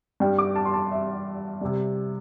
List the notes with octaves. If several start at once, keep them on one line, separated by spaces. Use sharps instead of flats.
G2 G3 G5
D6
A5
C6
A5
E5
C3 G3